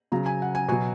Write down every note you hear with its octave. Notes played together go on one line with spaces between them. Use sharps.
C#3 F#3 A#5
G#5
F#5
G#5
B2 F#3 G#5